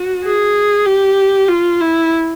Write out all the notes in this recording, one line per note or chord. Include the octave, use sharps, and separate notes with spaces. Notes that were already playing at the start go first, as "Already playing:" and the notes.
Already playing: F#4
G#4
G4
F4
E4